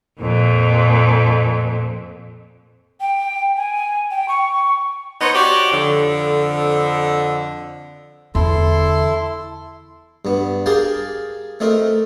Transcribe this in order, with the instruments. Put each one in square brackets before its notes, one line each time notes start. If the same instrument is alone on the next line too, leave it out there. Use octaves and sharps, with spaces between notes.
[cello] F2 A#2
[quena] G5
G#5
G5
C#6
[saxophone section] B3 D#4 C5 C#5
F#4 G4 C#5 D5
F2 D3
[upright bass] E2 D3 [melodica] E4 A4 C6
[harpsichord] G2 B3
G4 G#4 A#4 F5 G5 A5
A3 C4 D#4 A#4